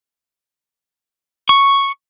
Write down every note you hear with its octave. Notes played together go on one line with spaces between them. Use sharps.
C#6